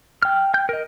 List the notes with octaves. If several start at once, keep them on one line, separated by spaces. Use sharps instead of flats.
G5 F6
G5 G6
A#4 D#5